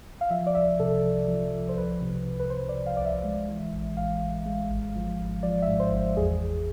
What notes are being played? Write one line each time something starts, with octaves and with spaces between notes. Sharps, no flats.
F5
F3 E5
D5
C2 E5
C3 A4
F3
F3
F3
C5
C2 B4
C3
C3
B4
C3 C5
D5
C3
F5
C2 D5
E5
G#3
E3
A1
A1 F5
A1
G#3
G#1
F3
G#1
F3 D5
E5
G#2
C5
G#1
E2 G#4
E2